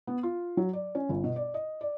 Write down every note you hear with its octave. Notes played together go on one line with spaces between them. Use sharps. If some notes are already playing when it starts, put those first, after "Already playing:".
B3
F4
F#3
D5
C#4
G1
B2
D5
D#5
D5